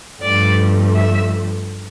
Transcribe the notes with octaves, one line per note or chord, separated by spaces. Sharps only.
G2 F3 A3 D5
E5